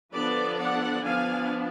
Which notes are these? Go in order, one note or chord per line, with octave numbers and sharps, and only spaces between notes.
D3 F3 B3 D4 B4 D5
D5 F#5
F3 B3 D4 F5 G#5